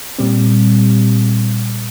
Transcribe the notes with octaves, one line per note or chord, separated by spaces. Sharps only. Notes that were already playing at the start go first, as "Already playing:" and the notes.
A#2 G3 C4